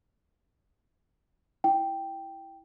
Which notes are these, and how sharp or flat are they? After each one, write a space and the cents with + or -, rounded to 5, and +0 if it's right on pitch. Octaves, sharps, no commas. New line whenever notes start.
E4 +0 G5 +0